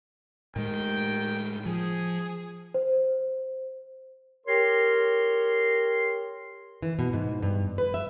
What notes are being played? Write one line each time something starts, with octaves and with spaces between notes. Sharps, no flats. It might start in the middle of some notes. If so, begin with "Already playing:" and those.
A2 D#3 G#3 G4 G5
F3 G#4
C5
G4 A#4 C#5 C6
E3
B2
G#2
G2
B4
E5